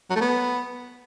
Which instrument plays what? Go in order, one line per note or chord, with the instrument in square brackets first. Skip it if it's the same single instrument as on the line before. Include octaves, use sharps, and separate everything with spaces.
[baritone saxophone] F#3
A3
B3